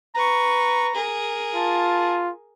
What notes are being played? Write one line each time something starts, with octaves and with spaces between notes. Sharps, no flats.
B4 A#5 C#6
G#4 A#4
F4 A5